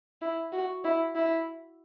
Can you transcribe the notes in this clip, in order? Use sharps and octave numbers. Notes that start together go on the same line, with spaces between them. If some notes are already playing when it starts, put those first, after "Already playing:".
E4
F#4
E4
E4